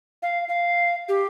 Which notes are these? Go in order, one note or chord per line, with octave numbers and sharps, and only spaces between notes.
F5
F5
G4